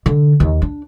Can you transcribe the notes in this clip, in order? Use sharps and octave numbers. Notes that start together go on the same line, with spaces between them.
D3
D#2
D4